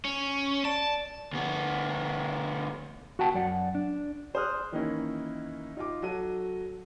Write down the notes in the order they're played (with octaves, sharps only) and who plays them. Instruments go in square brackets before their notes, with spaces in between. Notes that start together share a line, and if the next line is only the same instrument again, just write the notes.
[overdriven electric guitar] C#4
[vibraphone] D5 [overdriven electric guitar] A5
[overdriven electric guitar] D2 B3
[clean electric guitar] F#4 F#5 G5 A5
F#2 D5 F#5
D4
[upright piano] G#4 C5 D5 D#6 F6 F#6
D#3 E3 A#3 C#4 D#4 E4
D#4 F4 D6
F#3 F#4 A4 D#7